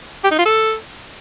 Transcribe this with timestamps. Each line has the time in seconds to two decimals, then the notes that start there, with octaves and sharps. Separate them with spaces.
0.24 G4
0.31 D#4
0.38 F4
0.45 A4